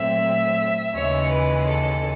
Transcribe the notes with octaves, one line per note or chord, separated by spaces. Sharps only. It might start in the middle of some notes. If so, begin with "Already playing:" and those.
Already playing: A#2 F#3 A3 C4 E5
D#2 C#3 E3 G#3 C#5
B4
A4